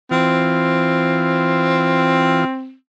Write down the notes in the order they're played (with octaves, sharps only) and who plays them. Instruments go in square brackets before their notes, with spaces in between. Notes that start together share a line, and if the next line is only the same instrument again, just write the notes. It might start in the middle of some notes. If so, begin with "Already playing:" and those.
[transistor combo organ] E3 F4 [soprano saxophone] C4